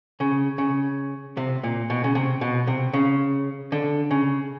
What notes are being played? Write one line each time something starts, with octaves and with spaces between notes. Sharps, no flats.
C#3
C#3
C3
A#2
B2
C#3
C3
B2
C3
C#3
D3
C#3